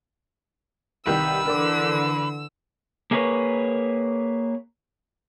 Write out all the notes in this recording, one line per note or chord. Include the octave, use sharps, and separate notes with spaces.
C2 D#3 G3 B4 E6
D3 E3 A#4 D5 D6
A#3 G#4 A#4 B4 C#5